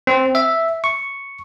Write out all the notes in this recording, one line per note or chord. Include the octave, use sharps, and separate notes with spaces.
C4
E5
C#6